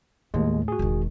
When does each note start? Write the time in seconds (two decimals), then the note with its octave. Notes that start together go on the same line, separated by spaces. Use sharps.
0.34 D#2 A2 G#3
0.68 F#4 G#4
0.79 E1 D#3